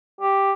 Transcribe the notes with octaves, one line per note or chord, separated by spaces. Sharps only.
G4